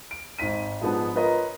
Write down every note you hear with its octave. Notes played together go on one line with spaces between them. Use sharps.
D7
G#1 D#4 C5 B6 D#7
G#2 F3 G#3 B3 D4
F4 A#4 B4 C#5 D#5 A#5